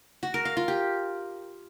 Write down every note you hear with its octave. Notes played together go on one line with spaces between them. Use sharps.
F#4
A#4
F5
F4
G4